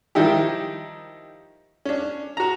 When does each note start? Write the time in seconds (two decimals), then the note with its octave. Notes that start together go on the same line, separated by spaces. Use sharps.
0.15 D#3 F3 G3 D#4 E4 G4
1.85 C#4 D4
2.37 F#4 A#5